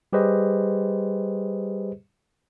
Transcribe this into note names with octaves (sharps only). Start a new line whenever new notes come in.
G3 G4 G#4 B4 C5 D#5